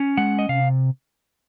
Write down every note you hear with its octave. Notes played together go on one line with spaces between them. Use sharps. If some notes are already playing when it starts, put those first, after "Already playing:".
Already playing: C#4
G#3 F#5
D#5
C3 F5